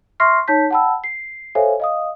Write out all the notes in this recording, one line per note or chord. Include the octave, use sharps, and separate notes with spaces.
E5 C6 C#6 F6 A#6 C7
D#4 C#5 A5 G6 B6
F#5 G5 A5 B5 E6
C7
A4 C5 C#5 E5 F5 G#5
D#5 F5 D#6